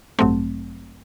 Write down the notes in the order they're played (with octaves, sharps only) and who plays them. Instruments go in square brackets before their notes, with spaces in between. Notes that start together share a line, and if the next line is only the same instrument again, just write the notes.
[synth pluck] A1 G2 F#3 A3 C4